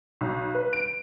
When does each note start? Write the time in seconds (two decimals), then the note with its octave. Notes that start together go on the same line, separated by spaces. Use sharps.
0.21 B1
0.55 B4
0.73 D7